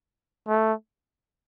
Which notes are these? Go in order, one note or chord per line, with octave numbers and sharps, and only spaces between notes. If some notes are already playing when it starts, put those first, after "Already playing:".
A3